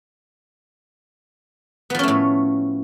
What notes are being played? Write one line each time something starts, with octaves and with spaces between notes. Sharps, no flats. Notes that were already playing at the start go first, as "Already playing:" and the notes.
A2 F3 A3 B3 C#4